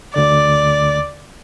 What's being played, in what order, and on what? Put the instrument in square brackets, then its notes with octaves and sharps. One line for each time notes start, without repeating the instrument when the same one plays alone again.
[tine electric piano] D2 D3 D6 [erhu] D5